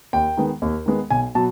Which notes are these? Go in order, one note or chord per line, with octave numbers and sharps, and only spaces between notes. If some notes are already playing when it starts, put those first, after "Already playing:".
D#2 G5
D#3 G#3 B3
D#2
D#3 G#3 B3
B1 G#5
B2 F#3 A5